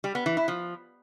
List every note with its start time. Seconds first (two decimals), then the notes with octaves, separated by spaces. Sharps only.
0.04 G3
0.15 B3
0.26 E3
0.37 E4
0.48 F3